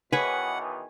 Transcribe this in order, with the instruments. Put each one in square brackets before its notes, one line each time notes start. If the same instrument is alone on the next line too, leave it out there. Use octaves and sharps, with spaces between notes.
[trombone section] B2 D#3 E3 [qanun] G#4 C#5 [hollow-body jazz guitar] B4 [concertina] F#5